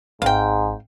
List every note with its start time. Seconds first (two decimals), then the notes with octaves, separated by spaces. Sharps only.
0.22 G#1 G#2 F5 G5